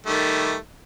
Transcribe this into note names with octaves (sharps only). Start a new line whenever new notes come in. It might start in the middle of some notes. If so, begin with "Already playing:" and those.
D#3 G3 A3